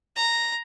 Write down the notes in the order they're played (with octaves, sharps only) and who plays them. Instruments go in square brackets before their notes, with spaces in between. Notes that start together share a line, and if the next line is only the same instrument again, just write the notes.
[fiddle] A#5